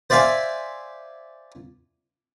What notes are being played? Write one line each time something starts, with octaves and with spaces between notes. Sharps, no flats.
C5 D5 E5 F5 G#5